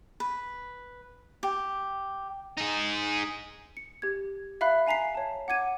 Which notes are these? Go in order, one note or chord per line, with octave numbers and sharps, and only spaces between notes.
B4
G4
D#4 G#4
C#7
G4 G#6
E5 F5 B5 F#6
F5 G#5 A#5 B6 C7
C#5 A5
F#5 D6 G#6 D#7